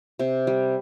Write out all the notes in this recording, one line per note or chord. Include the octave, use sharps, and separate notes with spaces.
C3
G3